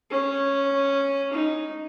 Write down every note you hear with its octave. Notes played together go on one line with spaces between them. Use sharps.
C#4
D#4